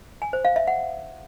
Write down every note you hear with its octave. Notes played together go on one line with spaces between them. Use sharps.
G#5
C5
F5
E5
F#5